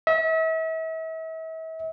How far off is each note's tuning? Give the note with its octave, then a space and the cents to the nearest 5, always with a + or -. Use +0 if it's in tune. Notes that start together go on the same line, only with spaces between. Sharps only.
E5 -40